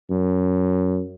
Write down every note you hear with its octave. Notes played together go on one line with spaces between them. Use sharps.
F#2